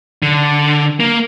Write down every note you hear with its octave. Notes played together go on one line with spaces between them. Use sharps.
D3
A#3